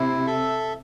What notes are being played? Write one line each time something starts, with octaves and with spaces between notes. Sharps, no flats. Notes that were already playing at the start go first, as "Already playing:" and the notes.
Already playing: C3 E4
A4 E5